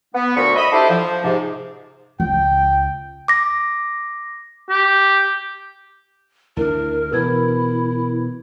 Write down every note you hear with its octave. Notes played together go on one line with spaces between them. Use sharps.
B3
D2 A#2 F3 A#4 B5 C#6
D#5 E5 B5
D4 E4 F#4 G4 A4 C5
F3
G#2 C3
C#2 G5
D6 A#6
G4
D2 D4 E4 A#4
B2 E3 E4 A#4 B4 G#6